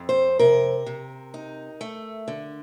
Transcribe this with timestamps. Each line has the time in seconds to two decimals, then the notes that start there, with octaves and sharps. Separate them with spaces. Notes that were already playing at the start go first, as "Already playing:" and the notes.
Already playing: F2 C4
0.09 C5
0.39 C3 A#4
0.86 C3
1.34 D#4
1.81 A3
2.28 D3